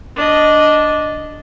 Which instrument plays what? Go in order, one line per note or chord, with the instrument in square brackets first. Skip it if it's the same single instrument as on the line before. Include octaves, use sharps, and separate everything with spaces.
[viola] D4 D#5